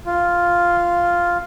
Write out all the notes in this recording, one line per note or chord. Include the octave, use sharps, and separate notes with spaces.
F4